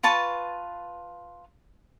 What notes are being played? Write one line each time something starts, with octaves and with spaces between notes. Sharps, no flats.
F4 B4 A5 C#6